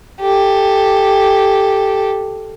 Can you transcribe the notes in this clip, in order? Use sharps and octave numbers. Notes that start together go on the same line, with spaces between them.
G4 A4